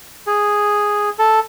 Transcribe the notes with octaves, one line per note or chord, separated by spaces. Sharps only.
G#4
A4